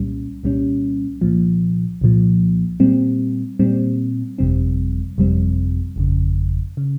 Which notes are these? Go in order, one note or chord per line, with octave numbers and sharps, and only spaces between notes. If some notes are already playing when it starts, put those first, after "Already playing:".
Already playing: C2 A#2 G3 C#4
C2 A#2 G3 C#4
C2 A#2 F3
C2 A#2 F3
A#2 G3 C4
A#2 G3 C4
G1 F2 C3 G3 C4
G1 F2 C3 G3 C4
G1 F2 C#3
C#3